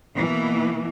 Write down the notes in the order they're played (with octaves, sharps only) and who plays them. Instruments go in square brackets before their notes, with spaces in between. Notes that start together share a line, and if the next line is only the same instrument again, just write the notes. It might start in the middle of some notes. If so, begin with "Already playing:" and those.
[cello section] B2 E3 A#3